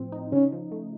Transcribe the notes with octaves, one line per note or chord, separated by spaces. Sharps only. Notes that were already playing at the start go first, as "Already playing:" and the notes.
Already playing: A2 F3 C4
D#4
C#3 C#4
F3
A3